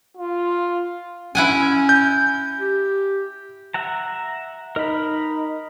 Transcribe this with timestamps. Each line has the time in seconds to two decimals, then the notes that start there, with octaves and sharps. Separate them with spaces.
0.17 F4
1.35 C#4 E4 F#5 G#5
1.89 G6
2.59 G4
3.74 E5 F#5 A#5
4.76 D#4 A#4 B5